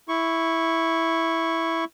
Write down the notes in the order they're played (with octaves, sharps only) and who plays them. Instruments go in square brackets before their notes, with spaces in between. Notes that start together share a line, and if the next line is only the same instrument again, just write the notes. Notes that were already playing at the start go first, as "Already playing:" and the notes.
[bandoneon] E4 C#6